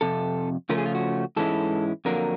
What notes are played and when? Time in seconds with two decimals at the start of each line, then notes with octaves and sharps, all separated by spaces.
0.01 F2 C3 A4
0.69 C#3 F3 A3 C#4 A#4
0.78 G#4
0.86 F4
0.95 F#4
1.36 G#2 E3 G#3 C#4 E4 A4
2.05 F2 D3 F#3 A#3 A#4